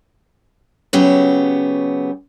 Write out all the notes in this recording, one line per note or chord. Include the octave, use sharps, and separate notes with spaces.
C#3 F#3 B3 G4